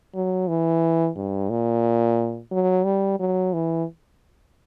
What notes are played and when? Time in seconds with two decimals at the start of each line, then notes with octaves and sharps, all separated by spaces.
0.14 F#3
0.48 E3
1.16 G2
1.50 A#2
2.52 F#3
2.85 G3
3.20 F#3
3.54 E3